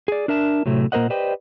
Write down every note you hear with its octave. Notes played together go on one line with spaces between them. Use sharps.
G#4 D5
D4 A#4 E5 A5
A2 C3 F#3 A3
A#2 A#3 A#4 C5 D#5 F#5
G4 B4 C5 D5 D#5 G5